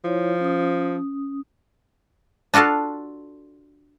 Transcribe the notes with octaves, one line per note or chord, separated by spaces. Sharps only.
F3 E4 C#5
C#4 D#6
D4 F4 F#4 A4 F5